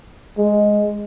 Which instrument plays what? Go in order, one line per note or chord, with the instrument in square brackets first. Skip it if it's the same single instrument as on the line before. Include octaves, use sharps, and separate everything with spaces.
[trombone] G#3